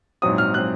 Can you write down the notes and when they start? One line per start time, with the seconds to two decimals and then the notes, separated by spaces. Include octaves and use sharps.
0.22 A#1 G#2 F#3 C4 D#6
0.38 F6
0.54 F#3 C4 F#6